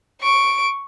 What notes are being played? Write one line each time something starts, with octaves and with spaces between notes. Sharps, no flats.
C#6 D7